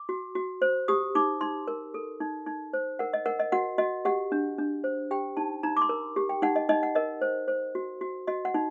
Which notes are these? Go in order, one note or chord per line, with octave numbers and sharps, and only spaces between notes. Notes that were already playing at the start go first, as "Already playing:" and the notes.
Already playing: D6
F#4
F#4
C5
G4 D#6
D#4 D6
D#4 C6
A#4
A4
D#4
D#4
C5
A#4 F#5
D#5
A#4 F#5
D#5
F#4 F#5
F#4 D#5
G4 F#5
D4
D4
C5
G4 G5
D#4 A5
D#4 A#5
D6
C6
A#4
G4
G5
D#4 F#5
D#5
D#4 D#5
F#5
A#4 D#5
C5
C5
F#4
F#4
F#4 D#5
F#5
D#4